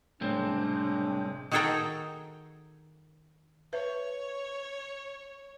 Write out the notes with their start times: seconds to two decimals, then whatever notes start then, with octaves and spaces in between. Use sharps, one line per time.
0.21 F#1 C2 A2 G#3 C4 D4
1.51 D#3 F#4 G#4 A4 G5 A#5
3.73 B4 C#5 E5